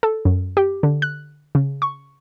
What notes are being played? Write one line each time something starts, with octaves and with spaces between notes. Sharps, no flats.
A4
F#2
G4
D3
F#6
C#3
C#6